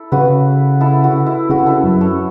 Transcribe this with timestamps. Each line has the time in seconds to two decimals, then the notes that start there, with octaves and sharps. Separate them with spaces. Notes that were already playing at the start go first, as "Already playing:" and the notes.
Already playing: E4 A4
0.12 C#3 F#4 B4
0.81 E4 A4
1.04 F#4
1.26 E4
1.49 C#3 F#4
1.66 E4 A4
1.84 F#2
2.01 A4 C#5